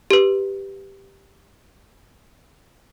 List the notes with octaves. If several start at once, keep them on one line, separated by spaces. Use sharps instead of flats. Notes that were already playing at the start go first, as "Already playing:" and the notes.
G4 B4